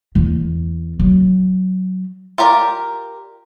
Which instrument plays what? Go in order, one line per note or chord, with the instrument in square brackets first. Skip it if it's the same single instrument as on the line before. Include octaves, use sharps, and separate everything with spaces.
[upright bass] E2
F#3
[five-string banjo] F4 G4 A#4 D5